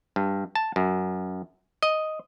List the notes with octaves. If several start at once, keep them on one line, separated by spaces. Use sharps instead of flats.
G2
A5
F#2
D#5